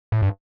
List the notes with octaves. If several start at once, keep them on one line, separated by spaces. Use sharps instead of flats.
A2
G2